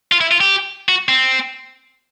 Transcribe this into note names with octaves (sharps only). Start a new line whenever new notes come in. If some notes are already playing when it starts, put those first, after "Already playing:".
F4
E4
F4
G4
F#4
C4